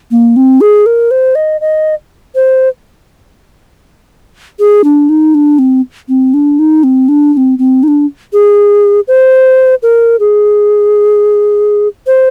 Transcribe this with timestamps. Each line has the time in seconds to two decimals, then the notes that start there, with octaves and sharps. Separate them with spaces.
0.11 A#3
0.36 C4
0.61 G#4
0.86 A#4
1.11 C5
1.35 D#5
1.61 D#5
2.35 C5
4.59 G#4
4.84 D4
5.09 D#4
5.35 D4
5.59 C4
6.09 C4
6.34 D4
6.59 D#4
6.84 C4
7.09 D4
7.33 D4
7.37 C4
7.59 C4
7.83 D#4
7.88 D4
8.33 G#4
9.08 C5
9.83 A#4
10.20 G#4
12.07 C5